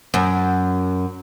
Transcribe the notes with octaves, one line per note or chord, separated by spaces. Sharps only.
F#2